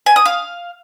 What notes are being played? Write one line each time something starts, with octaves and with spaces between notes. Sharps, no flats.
G#5
D#6
F5